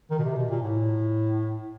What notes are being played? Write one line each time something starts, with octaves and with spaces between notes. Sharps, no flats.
D#3
B2
C3
B2
A#2
A2